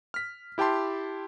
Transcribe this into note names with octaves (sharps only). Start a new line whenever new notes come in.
F6 B6
E4 G4 G5 A5 C6